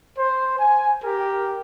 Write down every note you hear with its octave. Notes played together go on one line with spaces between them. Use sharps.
C5
G#5
G4 A#4